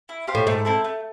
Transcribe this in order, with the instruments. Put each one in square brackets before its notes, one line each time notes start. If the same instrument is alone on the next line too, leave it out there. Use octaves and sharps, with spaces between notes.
[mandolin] E4
G4 C5 F5
[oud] A2
[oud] G#2 [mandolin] A3
[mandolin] C4 E4 A4
A3